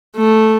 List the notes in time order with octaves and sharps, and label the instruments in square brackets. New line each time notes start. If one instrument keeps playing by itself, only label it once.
[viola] A3